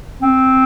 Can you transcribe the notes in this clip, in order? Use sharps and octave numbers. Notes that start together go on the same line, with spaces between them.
C4